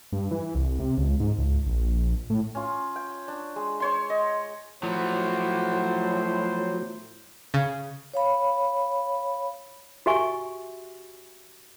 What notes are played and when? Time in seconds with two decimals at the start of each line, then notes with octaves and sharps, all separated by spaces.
0.12 G2
0.31 E3
0.55 C2
0.79 C3
0.98 C#2
1.20 G#2
1.38 C#2
1.67 A#1
2.30 A2
2.55 C#4 F4
2.96 G5
3.28 D4
3.56 G#3
3.80 C5 C#5 C6
4.10 D#5
4.83 A2 F3 F#3 B3 C5
7.54 C#3
8.13 C#5 F5 B5
10.06 F#4 G4 E5 G#5 C#6